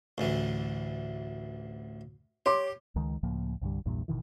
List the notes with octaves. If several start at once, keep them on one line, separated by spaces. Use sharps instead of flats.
A1 D2 E3
G4 C#5 C6 D6
C#2 D#3 G#3
C#2 A2 F3 A#3
C2 G2 D3 G3
A#1 E2 G2 A#2
G#1 B2 D#3 E3